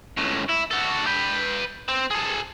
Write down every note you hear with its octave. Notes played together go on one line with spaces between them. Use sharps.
C#2 A2
E4
F#4 A4
B4 G5
C4
G#4 A4